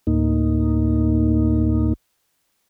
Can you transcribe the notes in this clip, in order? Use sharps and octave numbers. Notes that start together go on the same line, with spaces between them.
D2 A2 A#3 D#4